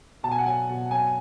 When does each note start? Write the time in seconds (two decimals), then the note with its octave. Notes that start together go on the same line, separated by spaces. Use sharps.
0.23 B2 A5
0.31 G#5
0.38 F#5
0.46 F#3 G#5
0.69 B2
0.91 F#3 G#5